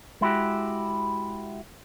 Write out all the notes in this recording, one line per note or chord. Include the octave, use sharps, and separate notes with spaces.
G#3 E4 F#4 G4